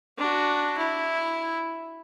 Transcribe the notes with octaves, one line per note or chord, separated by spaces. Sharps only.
D4 F#4
E4